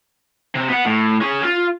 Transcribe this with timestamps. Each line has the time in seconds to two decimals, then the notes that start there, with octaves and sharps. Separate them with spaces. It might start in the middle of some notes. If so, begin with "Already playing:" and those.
0.55 C3
0.69 B3 F#5
0.85 A2
1.21 C#4 G#4
1.43 F4